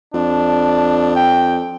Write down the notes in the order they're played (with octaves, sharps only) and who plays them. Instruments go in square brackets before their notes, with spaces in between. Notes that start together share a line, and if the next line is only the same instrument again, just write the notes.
[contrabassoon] F2 [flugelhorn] D4
[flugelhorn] G5